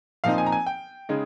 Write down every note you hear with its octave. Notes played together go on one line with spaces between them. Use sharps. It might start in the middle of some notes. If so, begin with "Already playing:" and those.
A#2 F3 C4 D#4 F5
G#5
A#5
G#5
G5
C#3 G#3 D#4